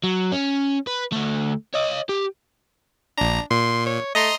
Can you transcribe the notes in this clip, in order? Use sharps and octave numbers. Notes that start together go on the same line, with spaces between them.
F#3
C#4
B4
D2 A3
C#5 D#5
G4
A#1 D4 A#5
A#2 C6
C#5
A3 D#5 A#5 C6